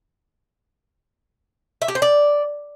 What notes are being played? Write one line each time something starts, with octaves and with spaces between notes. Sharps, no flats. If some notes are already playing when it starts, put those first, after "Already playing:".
E5
G4
C5
D5